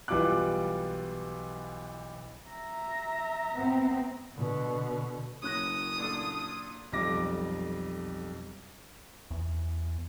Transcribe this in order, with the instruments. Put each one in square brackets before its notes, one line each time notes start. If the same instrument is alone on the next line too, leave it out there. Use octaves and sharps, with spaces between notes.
[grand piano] B1 E3 G3 F4 D6 F#6
[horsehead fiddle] E5 A#5
[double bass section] B3 C4
[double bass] B2 D3
[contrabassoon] F#1 [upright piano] C#4 F#6 A#6 [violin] D#6
[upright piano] A#2 D4 A4
[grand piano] B1 F2 G3 D6 A#6
[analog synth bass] E2